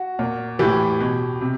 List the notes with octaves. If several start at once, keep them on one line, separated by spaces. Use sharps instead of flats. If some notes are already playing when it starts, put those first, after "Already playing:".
Already playing: F#4
A#2
A2 E3 G4
B2
C3